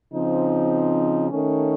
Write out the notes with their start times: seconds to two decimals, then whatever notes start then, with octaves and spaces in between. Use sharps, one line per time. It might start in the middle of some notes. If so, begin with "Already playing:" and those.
0.12 C#3 F3 C4 D#4
1.30 D#3 A3 C#4